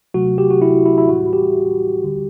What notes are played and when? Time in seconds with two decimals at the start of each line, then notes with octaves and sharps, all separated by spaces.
0.14 C3 F#3 A3 F#4
0.38 G4
0.50 F#4
0.62 E4
0.86 E4
0.98 E4
1.09 A2 E3 G3 F#4
1.33 G4
2.04 D3 G3